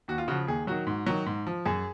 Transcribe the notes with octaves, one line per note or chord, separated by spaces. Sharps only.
D#2 F#4
F4
C#3 F3 F#4
D#2 G#4
D#3 F#3 F#4
G#2
D#3 F#3
G#2
F3
F#2 G#4